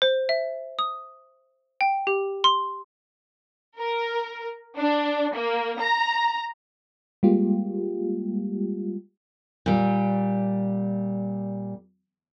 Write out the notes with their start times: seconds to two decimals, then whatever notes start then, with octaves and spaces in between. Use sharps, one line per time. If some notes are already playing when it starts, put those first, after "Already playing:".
0.02 C5
0.29 E5
0.79 D#6
1.81 G5
2.07 G4
2.44 C6
3.79 A#4
4.78 D4
5.34 A#3
5.80 A#5
7.23 G3 G#3 A#3 F4 G4
9.66 A#2 G3